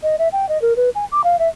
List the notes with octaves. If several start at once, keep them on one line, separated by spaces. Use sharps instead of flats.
D#5
E5
G5
D#5
A#4
B4
G#5
D6
F5
E5